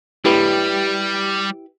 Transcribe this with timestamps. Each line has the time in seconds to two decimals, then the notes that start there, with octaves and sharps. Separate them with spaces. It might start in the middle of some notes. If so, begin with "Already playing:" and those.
0.25 G3 E4 G4 B4